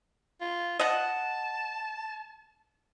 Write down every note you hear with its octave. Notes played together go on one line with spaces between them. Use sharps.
F4
D#5 F#5 A5